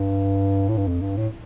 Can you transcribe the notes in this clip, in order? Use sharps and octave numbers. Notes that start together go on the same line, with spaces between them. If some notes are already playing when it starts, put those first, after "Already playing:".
Already playing: G2
A2
G2
F2
G2
A2